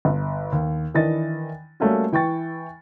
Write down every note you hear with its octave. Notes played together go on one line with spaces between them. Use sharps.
G1
D#2
D#3 E3 D4 D#5 A6
G3 A3 A#3 C#4 F#4
E3 G5 C#6 A6